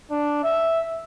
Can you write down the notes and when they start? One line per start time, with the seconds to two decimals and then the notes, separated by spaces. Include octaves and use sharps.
0.11 D4
0.44 E5